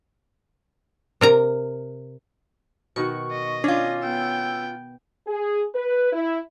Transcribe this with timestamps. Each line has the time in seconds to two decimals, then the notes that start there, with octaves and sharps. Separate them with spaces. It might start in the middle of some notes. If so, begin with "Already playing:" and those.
1.21 C3 A#4 A#5
2.96 B2 D#3 F#4 C#6
3.31 D#5
3.64 C#4 D4 F4
4.02 B3 G5 E6
5.27 G#4
5.73 B4
6.13 E4